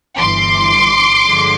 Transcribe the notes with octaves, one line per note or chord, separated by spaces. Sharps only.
G1 G2 E3 C6 D6
G2 D3 F3 G#3